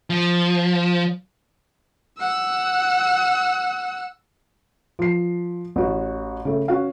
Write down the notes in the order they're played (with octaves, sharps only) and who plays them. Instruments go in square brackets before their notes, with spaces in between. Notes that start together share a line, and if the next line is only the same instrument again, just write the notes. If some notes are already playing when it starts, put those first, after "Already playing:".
[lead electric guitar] F3
[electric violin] F#5 E6
[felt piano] F3 C7
A1 F#4
C#3 A3
C#4 F#4 F5